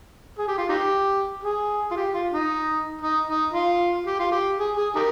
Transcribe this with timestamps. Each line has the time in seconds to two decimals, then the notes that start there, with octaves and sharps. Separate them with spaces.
0.39 G#4
0.48 G4
0.58 F4
0.69 D#4 G4
1.44 G#4
1.91 F4
1.97 G4
2.14 F4
2.32 D#4
3.02 D#4
3.28 D#4
3.54 F4
4.06 G4
4.19 F4
4.32 G4
4.59 G#4
4.77 G#4
4.95 D#4 G4 A#4